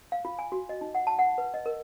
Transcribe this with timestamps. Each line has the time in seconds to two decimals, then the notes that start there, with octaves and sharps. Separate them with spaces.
0.12 F5
0.25 F4
0.39 G#5
0.52 F#4
0.69 D#5
0.81 D#4
0.95 F#5
1.07 A5
1.19 F#5
1.38 B4
1.54 D#5
1.66 A#4